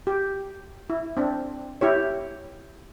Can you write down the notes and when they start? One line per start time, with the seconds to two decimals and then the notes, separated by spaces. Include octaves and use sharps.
0.07 G4
0.90 E4
1.17 C4 D4
1.81 E4 G4 C#5